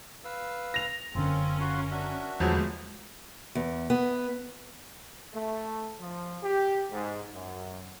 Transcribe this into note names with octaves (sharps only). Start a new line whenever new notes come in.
B4 F5 E6
A#6 F7
F#1 D3 C4 C#4 F4 A#4
F4 F#4 C6
D4 F#4 E5
G1 E2 F3 F#3 G#3 A3 B3
E2
B3
A3
F3
G4
G#2
F#2